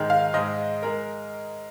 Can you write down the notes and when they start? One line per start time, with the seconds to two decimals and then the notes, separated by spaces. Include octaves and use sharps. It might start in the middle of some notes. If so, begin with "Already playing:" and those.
Already playing: G#2 D#3 G#3
0.10 F5
0.34 G#2 G#3 D#5
0.83 G#3 A#4